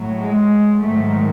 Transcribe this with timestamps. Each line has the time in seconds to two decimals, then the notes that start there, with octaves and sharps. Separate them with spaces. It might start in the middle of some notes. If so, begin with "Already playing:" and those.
Already playing: A2 F#3
0.17 G#3
0.80 G#2 D#3 F#3 A3